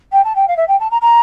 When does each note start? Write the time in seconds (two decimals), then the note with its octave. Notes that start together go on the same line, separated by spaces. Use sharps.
0.12 G5
0.24 A5
0.35 G5
0.48 F5
0.56 E5
0.68 G5
0.80 A5
0.91 A#5
1.01 A#5